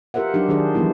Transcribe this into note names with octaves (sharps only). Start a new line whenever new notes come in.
F4 G4 A#4 C5 E5 F#5
F#3 D4 D#4 G4
D#3 F#3 D4 G#4 C5
E3 F3 G3 B3 D#4 E4